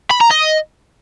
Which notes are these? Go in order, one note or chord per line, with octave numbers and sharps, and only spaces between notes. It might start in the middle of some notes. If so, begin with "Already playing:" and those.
B5
A#5
D#5